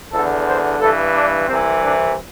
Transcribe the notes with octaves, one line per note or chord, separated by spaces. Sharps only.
E2 D3 A4
C5
G2 E3 A4
D4
C2 C3 E3 C4
D4